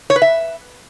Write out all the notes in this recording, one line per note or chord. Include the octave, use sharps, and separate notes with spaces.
C#5
B4
E5